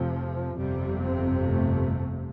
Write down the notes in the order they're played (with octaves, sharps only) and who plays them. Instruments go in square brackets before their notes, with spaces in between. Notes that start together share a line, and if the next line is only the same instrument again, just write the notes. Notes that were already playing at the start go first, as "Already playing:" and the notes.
Already playing: [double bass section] F1 F2 C3 F3
G1 F2 C3 G3
C4
A3